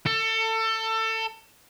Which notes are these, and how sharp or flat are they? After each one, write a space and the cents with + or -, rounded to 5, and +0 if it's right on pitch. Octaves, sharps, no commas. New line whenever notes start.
A4 +25